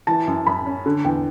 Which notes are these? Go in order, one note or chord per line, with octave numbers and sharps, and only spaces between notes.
E3 A5
F#2
F#2 B5
C#4
D3
E2 G5